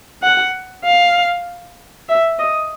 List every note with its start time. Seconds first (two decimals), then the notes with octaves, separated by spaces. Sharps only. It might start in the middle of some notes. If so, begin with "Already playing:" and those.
0.23 F#5
0.84 F5
2.09 E5
2.39 D#5